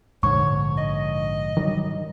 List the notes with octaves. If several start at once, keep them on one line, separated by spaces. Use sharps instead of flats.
A#1 G#2 D3 C#5 C#6
D#5
D#3 F#3 G3